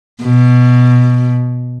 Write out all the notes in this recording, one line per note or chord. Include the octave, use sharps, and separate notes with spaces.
B2